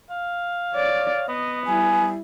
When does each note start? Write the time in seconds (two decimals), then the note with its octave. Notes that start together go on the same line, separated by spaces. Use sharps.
0.10 F5
0.74 C#5 D5
1.29 B3 D#5
1.67 G3 E4 G#5